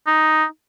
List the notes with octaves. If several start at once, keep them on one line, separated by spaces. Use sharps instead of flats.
D#4